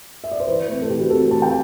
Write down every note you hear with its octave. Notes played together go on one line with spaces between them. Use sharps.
E5
D5
C5
E3 B4
A3 C4
A4
E3 G4
F#4
A3 C4 A4
E3 A5
G5